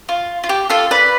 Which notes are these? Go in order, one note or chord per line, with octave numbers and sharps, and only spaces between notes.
F4
F4
G4
F4 A4
B4 D5